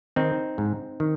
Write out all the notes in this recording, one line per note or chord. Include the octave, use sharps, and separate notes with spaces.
D#3 C4 D#4
G#2
D#3